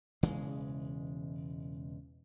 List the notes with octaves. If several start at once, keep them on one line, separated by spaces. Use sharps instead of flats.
E1 C#3 E3 G#3